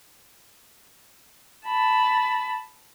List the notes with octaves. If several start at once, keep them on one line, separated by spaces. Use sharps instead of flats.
A5 B5